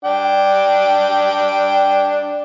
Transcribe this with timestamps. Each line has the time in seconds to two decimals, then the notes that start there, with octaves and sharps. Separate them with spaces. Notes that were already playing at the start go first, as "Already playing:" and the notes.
0.05 D4 G5